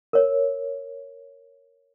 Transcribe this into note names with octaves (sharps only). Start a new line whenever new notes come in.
A#4 C#5